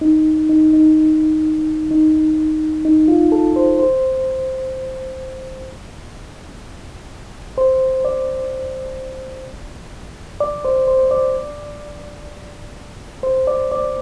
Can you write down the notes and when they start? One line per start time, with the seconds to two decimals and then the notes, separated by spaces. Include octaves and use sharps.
0.01 D#4
0.49 D#4
0.73 D#4
1.91 D#4
2.85 D#4
3.08 F4
3.32 A4
3.56 C5
3.79 C5
7.58 C5
8.05 D5
10.40 D5
10.65 C5
10.87 C5
11.11 D5
13.23 C5
13.47 D5
13.72 D5